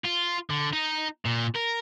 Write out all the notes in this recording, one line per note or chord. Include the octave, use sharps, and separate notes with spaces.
F4
D3
D#4
A#2
A#4